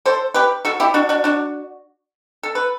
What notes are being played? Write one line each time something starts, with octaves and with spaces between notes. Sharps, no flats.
A4 C5
G4 B4
F#4 A4
E4 G4
D4 F#4
D4 F#4
D4 F#4
A4
B4